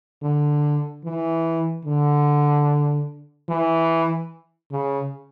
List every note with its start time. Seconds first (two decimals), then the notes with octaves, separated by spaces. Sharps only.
0.22 D3
1.04 E3
1.85 D3
3.49 E3
4.71 C#3